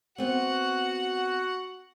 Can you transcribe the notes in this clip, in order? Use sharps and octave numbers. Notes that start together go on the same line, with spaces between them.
B3 C4 F#4 F#5